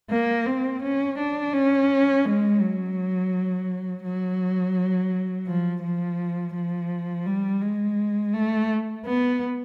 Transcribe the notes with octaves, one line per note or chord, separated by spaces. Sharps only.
A#3
C4
C#4
D4
C#4
G#3
F#3
F#3
F3
F3
F3
G3
G#3
A3
B3